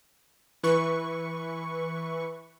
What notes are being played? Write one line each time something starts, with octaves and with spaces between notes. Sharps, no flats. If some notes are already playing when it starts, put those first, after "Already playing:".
E3 B4 C#6